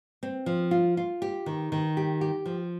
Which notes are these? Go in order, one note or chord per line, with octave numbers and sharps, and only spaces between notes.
C4
F3
F4
F4
G4
D#3
D#3
G4
G4
F3